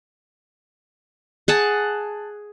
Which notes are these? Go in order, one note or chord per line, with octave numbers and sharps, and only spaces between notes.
G#4 F#5 A5